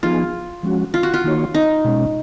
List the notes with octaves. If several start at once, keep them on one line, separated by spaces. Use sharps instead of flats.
F3 B3 D#4 F4 G#4
F3 G#3 C#4 F#4
F4
F#4
F4
D#3 A#3 D#4 F#4 C#5
D#4
B2 G#3 C#4